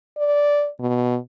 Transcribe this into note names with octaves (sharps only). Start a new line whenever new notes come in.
D5
B2